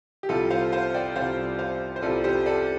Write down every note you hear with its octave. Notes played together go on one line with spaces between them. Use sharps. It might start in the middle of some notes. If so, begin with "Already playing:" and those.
G4
C2 C3 G3 F4 A4
C5 F5
C5 F5
D5 G5
C2 C3 G3 F4 C5 F5
C5 F5
C5
C2 C3 G3 F4 A4 D5
G4 C5
A4 D5